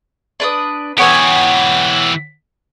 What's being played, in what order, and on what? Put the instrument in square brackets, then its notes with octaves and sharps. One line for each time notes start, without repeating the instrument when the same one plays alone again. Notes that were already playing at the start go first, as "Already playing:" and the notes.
[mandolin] D4 B4 D#6
[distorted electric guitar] E3 G4 [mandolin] B3 C#5 G#5